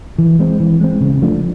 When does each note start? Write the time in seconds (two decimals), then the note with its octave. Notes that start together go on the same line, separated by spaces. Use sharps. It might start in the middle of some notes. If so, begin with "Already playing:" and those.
0.19 E3
0.39 G#3 C4
0.60 E3
0.81 G#3 C4
1.01 C#3
1.22 F3 A3 D4